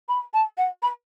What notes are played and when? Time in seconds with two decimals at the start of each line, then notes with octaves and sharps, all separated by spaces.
0.08 B5
0.33 A5
0.57 F#5
0.82 B5